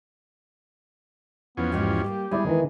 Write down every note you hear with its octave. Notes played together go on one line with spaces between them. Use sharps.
E2 F3 B3 C#4
G#2 E3 F#4 G4
G3 A3 A#3
E2 G3 G#3 E4 D5
D#3 E3